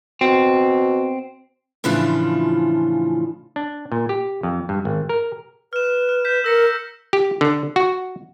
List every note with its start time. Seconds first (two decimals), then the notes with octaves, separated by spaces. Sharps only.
0.21 B2 C4
1.84 A2 C#3 E3 F3 D4 F4
3.56 D4
3.92 A#2
4.09 G4
4.43 F2
4.69 G2
4.85 G#1
5.09 A#4
5.73 B4 F6 E7
6.09 F6
6.25 G6 B6 E7
6.44 A#4 E6 A#6 C#7
7.13 G4
7.41 D3
7.76 F#4